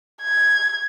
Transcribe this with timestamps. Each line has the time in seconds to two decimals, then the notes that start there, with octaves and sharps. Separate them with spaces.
0.23 G#6